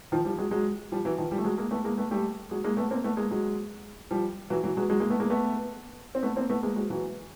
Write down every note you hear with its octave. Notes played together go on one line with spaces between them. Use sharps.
D#3 F3
F3 G3
F#3 G#3
F#3 G#3
F3 G3
E3 F#3
D#3 F3
F3 G3
A3
F#3 G#3
G#3 A#3
A3 B3
G#3 A#3
A3 B3
G3 A3
F#3 G#3
G#3 A#3
A3 B3
A#3 C4
A3 B3
G#3 A#3
F#3 G#3
F3 G3
E3 F#3
E3 F#3
F#3 G#3
F#3 G#3
G#3 A#3
A3 B3
G#3 A#3
A3 B3
C4
A3 B3
A#3 C4
A3 B3
G#3 A#3
F#3 G#3
E3 F#3